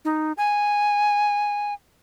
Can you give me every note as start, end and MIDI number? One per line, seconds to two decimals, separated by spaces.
0.05 0.32 63
0.37 1.74 80